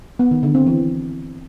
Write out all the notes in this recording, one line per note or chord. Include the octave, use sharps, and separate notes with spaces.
B3
D#3
D3
C4
E3